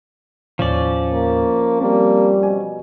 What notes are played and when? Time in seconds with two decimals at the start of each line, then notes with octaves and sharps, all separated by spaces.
0.59 D#2 A2 F3 C#4 D5
1.12 A#3
1.81 G3 A#3 C4
2.43 B2 G#5